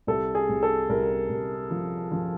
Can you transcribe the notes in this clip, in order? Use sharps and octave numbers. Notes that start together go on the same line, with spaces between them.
C2 A4
G#4
C2
A4
C2 A#4
C2
F3
F3